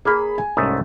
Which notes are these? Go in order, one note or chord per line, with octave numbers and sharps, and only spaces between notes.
A#3 G#4 C#5 B5
G#5
C2 G#2 A3 C#4 D#6